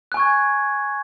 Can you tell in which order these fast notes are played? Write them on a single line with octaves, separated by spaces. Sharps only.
F#6 G#5 C#6 G#6